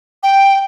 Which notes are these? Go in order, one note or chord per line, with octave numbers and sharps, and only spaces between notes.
G5